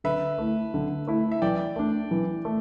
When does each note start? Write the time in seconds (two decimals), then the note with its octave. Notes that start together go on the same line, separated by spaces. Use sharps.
0.04 D3 B4 E5
0.38 A3 E4
0.74 D3
1.07 A3 E4
1.32 E5
1.42 E3 D5 G5
1.76 A3 D4
2.11 E3
2.45 A3